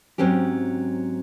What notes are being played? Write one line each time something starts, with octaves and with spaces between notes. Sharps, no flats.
G#2 F#3 C4 C#4 G4